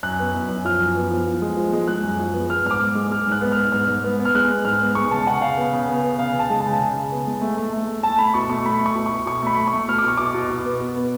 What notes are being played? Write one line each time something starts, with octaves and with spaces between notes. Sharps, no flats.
F#2 F#6
B3
F#2
F#2
F3 F6
F#2
B3
F3
F3
G#3
F3
G#3
G#3 F#6
F#2
F3
B3
B3 F6
G#2 F6
D6
G#2
G#3
G#3 F6
G#2 F#6
B3
B3 F6
G#2 F6
G#2
B3
B3
F6
G#3 F#6
B3
G#2 F6
B3
G#3 C#6
C#3 A5
C#3 F#5
C#3 F5
B3
C#3
B3
B3
C#3 F5
C#3
A5
G#3
A5
C#3
C#3
C#3
B3
G#3
A3
A3
A3
A3
A3 A5
A3 B5
B2 C#6
A3 C#6
A3 B5
A3
C#6
B2
C#6
B2
B2 C#6
A3 B5
A3
C#6
A3
B2 F6
D6
B2 C#6
B2 D6
B2
B2
B3
B2
B3